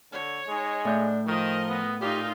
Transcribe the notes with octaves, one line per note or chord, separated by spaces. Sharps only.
D3 C#5
G#3 D#4
A2 D4 G6
D#3 F3 A#4 D#5
B3
A#2 D#4 F4 G4